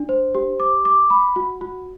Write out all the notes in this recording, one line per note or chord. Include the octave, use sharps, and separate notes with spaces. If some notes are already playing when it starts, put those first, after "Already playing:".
Already playing: D4
C5
G4
D6
D6
B5
F#4
F#4